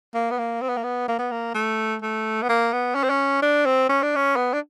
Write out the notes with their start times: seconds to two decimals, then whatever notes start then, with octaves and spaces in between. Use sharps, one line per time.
0.14 A#3
0.31 B3
0.38 A#3
0.61 C4
0.69 B3
0.77 A#3
0.83 B3
1.08 A#3
1.19 B3
1.31 A#3
1.54 A3
2.02 A3
2.43 B3
2.49 A#3
2.73 B3
2.95 C#4
3.03 C4
3.10 C#4
3.42 D4
3.66 C4
3.89 C#4
4.03 D4
4.15 C#4
4.36 B3
4.54 D4